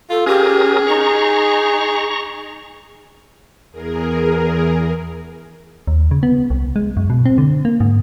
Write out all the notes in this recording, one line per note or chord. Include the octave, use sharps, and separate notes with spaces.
F4 A4
C#4 G4 G#4 A#4 D#6
D#4 A#5 C#6
E2 G#4 A#4
D#2
C#3
B3
C2
G#3
F#2
B2
C4
D3
A#3
G#2